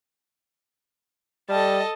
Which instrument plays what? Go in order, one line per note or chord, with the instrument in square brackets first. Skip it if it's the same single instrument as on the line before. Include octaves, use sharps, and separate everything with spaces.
[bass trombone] G3 [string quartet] A4 D#5 A5